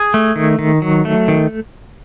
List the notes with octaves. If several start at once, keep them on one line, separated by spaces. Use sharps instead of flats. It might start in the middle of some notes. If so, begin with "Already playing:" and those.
Already playing: G#4
A3
D#3
D#3
F#3
A3
D#3